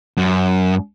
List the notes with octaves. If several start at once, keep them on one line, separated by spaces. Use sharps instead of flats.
F#2